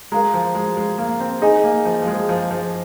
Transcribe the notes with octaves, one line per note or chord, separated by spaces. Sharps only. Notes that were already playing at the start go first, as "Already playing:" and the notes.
G#3 A#4 F5 A#5
F3
G#3
G#3
A#3
C4
D#4 G#4 D#5 G#5
A#3
F3
F3
G#3
F3
F3